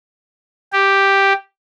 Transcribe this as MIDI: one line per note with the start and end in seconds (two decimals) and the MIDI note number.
0.73 1.33 67